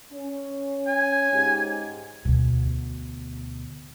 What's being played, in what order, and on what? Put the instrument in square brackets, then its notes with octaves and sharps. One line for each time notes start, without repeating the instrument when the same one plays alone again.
[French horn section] C#4
[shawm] G#5
[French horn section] G#2 G4
[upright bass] D2 B2